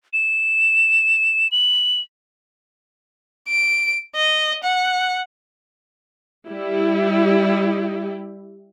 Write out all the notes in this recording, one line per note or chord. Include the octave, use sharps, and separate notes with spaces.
E7
F#7
D7
D#5
F#5
G3 E4 G4